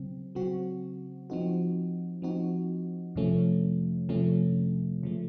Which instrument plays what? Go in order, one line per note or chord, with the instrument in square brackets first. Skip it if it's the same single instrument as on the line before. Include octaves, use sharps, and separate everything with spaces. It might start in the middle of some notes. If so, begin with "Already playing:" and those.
Already playing: [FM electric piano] C#3 F#3 C4
C#3 F#3 C4 F#4
F3 C4 D#4 F#4
F3 C4 D#4 F#4
F2 C3 F3 A3 C#4
F2 C3 F3 A3 C#4
C#3 F3 A3